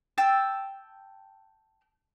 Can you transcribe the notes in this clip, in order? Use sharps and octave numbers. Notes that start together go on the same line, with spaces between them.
G5 A5 E6